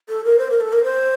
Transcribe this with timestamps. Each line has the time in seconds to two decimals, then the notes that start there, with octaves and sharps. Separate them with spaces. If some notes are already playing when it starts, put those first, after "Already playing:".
0.09 A4
0.24 A#4
0.39 C5
0.50 A#4
0.61 A4
0.73 A#4
0.84 C5